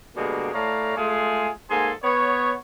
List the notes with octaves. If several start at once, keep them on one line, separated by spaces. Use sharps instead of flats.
B2 D3 G3 G#3 A#3
A2 A3 C#5 D5 F5 A#5
G#3 A3 F4 G#4
G#2 A#3 G#4 A4 G#5 C6
B3 C#5